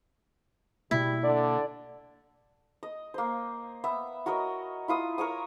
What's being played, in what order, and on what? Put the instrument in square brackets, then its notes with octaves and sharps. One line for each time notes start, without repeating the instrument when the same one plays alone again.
[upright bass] B2 A#3 [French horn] G3 [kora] E4
[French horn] D3 [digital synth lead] D5
[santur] D#5
A#3 C5
B3 E5
F#4 A#4 C#5 D#5
E4 F4 D#6
A#4 C#5 C#6 D#6